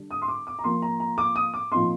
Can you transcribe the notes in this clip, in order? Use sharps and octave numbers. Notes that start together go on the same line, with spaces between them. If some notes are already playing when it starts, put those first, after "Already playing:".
Already playing: D3 G3 D4
D#6
C6
D6
D6
A#5
F3 A#3 F4 C6
A#5
A#5
D6
D#6
D6
A#2 F3 C4 D#4 C6